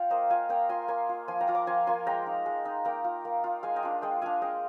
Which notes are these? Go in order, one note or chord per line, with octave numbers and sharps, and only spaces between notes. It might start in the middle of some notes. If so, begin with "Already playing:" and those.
Already playing: F4 F5 G5
A#3 C5 D#5
F4 F5 G#5
A#3 G5 A#5
F4 G#5 C6
A#3 G#5 C6
F4
F3 G#5 C6
G5 A#5
A#3 F4
A#5 D6
F3 G#5 C6
A#3 F4 G#5 C6
G#3 G5 A#5
D#4
G#3
D#4
A#3 G5 A#5
F4
A#3
F4
G#3 F5 G#5
D#5 G5
D4 F4
G#3 D#5 G5
D4 F4 F5 G#5
G#3 D#5 G5